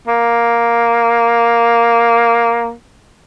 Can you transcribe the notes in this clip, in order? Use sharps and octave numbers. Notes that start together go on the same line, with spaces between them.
A#3